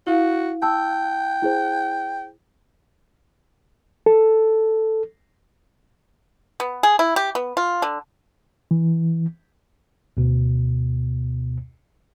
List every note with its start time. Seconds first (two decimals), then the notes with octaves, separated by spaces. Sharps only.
0.07 E4 F#4 F5
0.63 G5 A5 E6
1.42 E4 G#4 C5
4.06 A4
6.60 B3
6.83 G#4
6.99 E4
7.16 G4
7.35 B3
7.57 F4
7.82 D3
8.71 E3
10.17 D2 B2